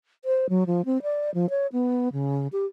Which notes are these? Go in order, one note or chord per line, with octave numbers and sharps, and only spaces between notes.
C5
F#3
F3
C4
D5
F3
C#5
B3
C#3
G4